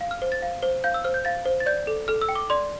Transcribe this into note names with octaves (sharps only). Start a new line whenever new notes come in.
F5
F6
C5
A6
F5
C5
F5 G6
E6
C5 F6
G6
F5 A6
C5
A6
D5 G6
A4
A4 F6
E6
G5
D6
D5 C6